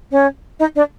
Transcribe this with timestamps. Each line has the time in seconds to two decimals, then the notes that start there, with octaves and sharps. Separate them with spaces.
0.11 C#4 C#5
0.60 D#4 D#5
0.76 D4 D5